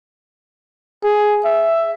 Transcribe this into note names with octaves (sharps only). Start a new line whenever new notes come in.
G#4
E5